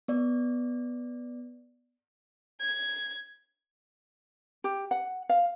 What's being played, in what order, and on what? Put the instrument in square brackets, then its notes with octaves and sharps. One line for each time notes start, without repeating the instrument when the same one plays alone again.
[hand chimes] B3 D5
[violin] G#6
[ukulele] G4
F#5
F5